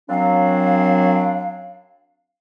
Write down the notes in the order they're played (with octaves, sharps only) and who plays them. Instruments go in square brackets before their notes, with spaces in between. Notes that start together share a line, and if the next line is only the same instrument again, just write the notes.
[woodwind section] F#2 F#3 C4 D4 F5